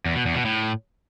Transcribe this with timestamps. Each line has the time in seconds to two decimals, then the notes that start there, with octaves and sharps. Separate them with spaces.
0.06 E2
0.15 B2
0.25 E2
0.35 B2
0.45 A2